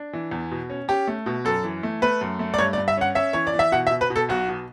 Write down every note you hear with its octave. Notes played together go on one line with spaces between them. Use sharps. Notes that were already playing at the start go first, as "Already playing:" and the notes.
Already playing: D4
E3
E2
B2
C#4
C#4 G4
A3
B2
F#2 A4
E3
A3
A3 B4
F#2
A3
D5
G2 C#5
D5
G2
E5
C#4 F#5
C#4 E5
E3 C#5
D5
E3
E5
B2 F#5
E5
B2
B4
B2
A4
B1 F#4
B2